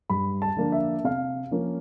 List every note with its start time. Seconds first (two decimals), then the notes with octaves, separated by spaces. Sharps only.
0.10 G2 B5
0.42 A5
0.57 D3 F3 A#3 D4
0.72 E5
1.04 C3 F5
1.51 F3 A#3 C#4 F4